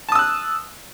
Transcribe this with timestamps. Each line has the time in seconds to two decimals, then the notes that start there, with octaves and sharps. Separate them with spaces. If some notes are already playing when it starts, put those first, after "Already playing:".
0.09 A5
0.12 D#6
0.15 E6
0.19 F#6